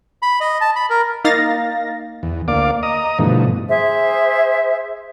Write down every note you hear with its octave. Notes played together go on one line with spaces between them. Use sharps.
B5
D#5
A5
B5
A#4
A#3 D#4 F5 A6 A#6
E2
D2 A#3 D5 F5 D6
D#5 A#5 D#6
G2 B2 D3 E3 F3 A3
G#4 C5 E5